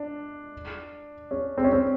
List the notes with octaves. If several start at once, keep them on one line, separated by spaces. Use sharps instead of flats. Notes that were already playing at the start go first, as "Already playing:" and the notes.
Already playing: D4
C#4
C4
C#4
C4